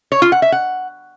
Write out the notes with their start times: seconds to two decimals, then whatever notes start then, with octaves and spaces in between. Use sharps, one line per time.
0.12 C#5
0.22 F4
0.32 F#5
0.42 E5
0.52 F#5